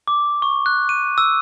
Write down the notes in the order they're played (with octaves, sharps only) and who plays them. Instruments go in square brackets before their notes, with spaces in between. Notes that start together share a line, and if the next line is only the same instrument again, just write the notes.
[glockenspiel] D6
C#6
F#6
D#7
E6